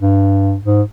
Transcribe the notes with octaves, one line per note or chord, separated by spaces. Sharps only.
G2
G#2